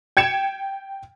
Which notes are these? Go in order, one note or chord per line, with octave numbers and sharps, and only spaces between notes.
G5 G#6 C#7 E7